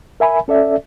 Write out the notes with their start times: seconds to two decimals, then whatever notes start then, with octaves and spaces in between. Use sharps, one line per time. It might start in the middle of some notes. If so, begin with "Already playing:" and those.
0.20 A#4 E5 G#5 B5
0.48 C#4 A4 D5 E5